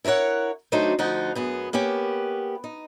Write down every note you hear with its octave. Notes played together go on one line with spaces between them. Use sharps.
E4 A#4 B4 C#5 F#5
D2 F#3 A3 D4 D#4 C5
D2 F3 D#4 F#5
F#2 B3 G#4
A#3 B3 C#4 G4
D#4